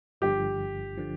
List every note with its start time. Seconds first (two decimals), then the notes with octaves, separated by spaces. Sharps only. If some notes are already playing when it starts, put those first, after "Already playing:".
0.21 G1 G2 D3 F3 G4
0.97 D3 F3